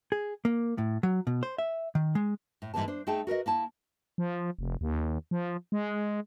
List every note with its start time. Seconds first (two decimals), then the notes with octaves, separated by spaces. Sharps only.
0.12 G#4
0.45 A#3
0.78 A2
1.03 F#3
1.27 B2
1.43 C5
1.58 E5
1.95 D#3
2.15 G#3
2.62 A2
2.74 G#2 C#3 E3 G3 A#3 A5
2.88 D4 C5
3.07 A3 D#4 G#4 G5 A5
3.27 F#4 A#4 B4 D#5
3.46 A#3 E4 A5
4.18 F3
4.59 F1
4.81 D#2
5.31 F3
5.72 G#3